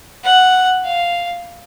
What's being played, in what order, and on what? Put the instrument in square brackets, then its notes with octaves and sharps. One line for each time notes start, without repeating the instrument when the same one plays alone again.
[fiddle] F#5
F5